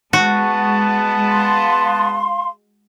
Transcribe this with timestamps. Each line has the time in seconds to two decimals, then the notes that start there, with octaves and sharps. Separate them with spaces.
0.13 G#3 B3 F#4 A5
1.29 F5 C6